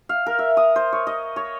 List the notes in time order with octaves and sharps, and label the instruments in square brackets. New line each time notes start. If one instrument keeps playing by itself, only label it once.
[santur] F5
A#4
E5
D#6
C5
C#5
D#5
C#5